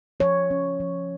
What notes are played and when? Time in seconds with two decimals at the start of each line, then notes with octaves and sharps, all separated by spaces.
0.20 F3 C#5
0.51 C#4
0.80 F3